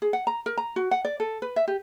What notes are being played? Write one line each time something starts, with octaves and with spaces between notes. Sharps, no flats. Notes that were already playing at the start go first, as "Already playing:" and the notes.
G#4
F#5
A#5
A#4
A#5
F#4
F#5
D5
A4
B4
E5
G4